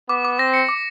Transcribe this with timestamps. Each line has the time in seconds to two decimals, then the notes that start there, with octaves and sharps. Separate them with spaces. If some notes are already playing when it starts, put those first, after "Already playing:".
0.09 B3 D6
0.25 D6
0.39 C4 A#6
0.54 C#7
0.69 D6